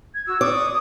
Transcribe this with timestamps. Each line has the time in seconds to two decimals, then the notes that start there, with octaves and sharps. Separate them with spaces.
0.14 G#6
0.27 F#4 E6
0.41 D5 C#6 D#6